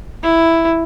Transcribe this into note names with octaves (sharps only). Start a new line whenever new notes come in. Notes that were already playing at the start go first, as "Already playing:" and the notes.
E4